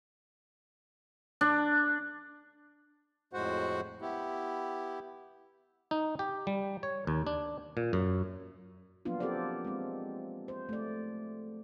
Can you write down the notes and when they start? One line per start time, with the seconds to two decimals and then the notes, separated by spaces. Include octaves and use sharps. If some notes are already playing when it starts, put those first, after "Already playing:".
1.41 D4
3.33 F2 A2 G#3 F#4 C5 F#5
4.02 B3 E4 G4
5.91 D#4
6.19 G4
6.47 G3
6.83 C#5
7.07 D#2
7.27 D4
7.77 A#2
7.93 F#2
9.05 F3 F#3 A#3 B3 D4 F4
9.20 C4 G4 A4 A#4 C5 D5
9.65 G#3 C4
10.48 C5
10.69 A3 D5